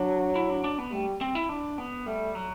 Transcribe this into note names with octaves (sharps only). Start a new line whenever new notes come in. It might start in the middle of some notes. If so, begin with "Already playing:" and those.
Already playing: F#3 D4
E4
D4
D4
B3
G3 A3
C4
E4
D4
B3
G3 A3
F#3